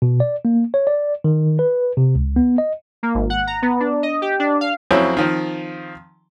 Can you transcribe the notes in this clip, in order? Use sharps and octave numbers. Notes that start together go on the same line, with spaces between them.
B2
D5
A#3
C#5
D5
D#3
B4
C3
C#2
B3
D#5
A#3
G#1
F#5
A#5
B3
D4
D#5
G4
D4
F5
F2 F#3 C4 C#4 E4
D#3 F3 C4